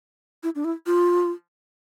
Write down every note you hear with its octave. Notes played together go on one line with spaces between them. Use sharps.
E4
D4
E4
F4